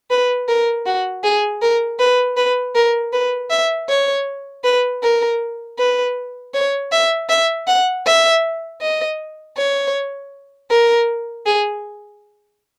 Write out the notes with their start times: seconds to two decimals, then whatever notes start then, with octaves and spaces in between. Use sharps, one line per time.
0.10 B4
0.48 A#4
0.86 F#4
1.23 G#4
1.62 A#4
1.99 B4
2.37 B4
2.75 A#4
3.13 B4
3.50 E5
3.89 C#5
4.64 B4
5.03 A#4
5.78 B4
6.54 C#5
6.92 E5
7.29 E5
7.67 F#5
8.06 E5
8.81 D#5
9.57 C#5
10.70 A#4
11.46 G#4